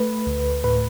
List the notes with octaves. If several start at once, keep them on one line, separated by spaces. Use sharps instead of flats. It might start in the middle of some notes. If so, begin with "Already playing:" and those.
Already playing: A3 B4
D2
A2 B4